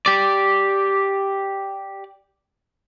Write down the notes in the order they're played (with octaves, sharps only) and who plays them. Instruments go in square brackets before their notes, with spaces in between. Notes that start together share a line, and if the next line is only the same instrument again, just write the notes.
[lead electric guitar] G4 D5